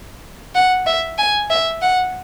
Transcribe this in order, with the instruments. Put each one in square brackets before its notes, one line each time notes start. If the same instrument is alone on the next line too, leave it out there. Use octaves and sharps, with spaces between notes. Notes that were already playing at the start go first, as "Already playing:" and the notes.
[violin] F#5
E5
G#5
E5
F#5